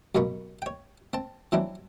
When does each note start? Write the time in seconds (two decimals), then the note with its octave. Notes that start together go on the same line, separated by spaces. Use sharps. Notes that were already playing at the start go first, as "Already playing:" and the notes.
0.15 F#2 B2 A#3 B5 C#6
0.62 C#5 G5
1.13 C4 A5
1.52 E3 F#3 C4 D4 E4